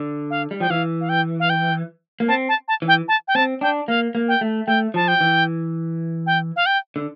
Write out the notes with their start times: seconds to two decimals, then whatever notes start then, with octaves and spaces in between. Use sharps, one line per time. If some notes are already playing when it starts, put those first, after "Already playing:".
Already playing: D3
0.30 F5
0.51 G3
0.60 F3 G5
0.70 E3 F5
1.01 F5
1.09 G5
1.40 F5
1.50 G5
2.20 A#3
2.28 C4 A5
2.49 A5
2.68 A5
2.82 E3
2.88 G5
3.08 A5
3.28 G5
3.35 C4 A5
3.61 D4 G5
3.88 A#3 F5
4.15 A#3
4.28 G5
4.41 A3
4.67 A3 G5
4.94 F3 A5
5.08 G5
5.21 E3
6.26 G5
6.56 F5
6.66 G5
6.96 D3